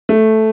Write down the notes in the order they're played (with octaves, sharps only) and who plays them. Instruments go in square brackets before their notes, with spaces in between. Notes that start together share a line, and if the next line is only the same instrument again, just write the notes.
[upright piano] A3